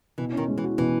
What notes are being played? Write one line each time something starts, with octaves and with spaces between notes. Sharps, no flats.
B2 E3
D#3 C#4
G#3
E3
F#4
B2 E3